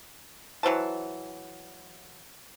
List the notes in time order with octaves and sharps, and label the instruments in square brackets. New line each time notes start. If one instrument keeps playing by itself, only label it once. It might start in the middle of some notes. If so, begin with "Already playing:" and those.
[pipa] E3 F#3 C5 A5